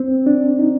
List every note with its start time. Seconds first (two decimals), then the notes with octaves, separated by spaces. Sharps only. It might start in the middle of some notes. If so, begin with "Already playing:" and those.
Already playing: C4
0.26 D4
0.59 D#4